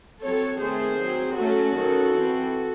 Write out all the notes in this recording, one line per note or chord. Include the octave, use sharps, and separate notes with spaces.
F#3 C4 A4 C#5
D#3 A3 C4 G#4 C5
F#3 C4
F#3 A3 C#4 F#4 A4
D#3 F#3 C#4
E3 C4